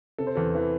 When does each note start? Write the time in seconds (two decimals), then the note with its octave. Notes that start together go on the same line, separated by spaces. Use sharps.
0.18 C3 A4
0.27 C5
0.35 E2 A4
0.55 E3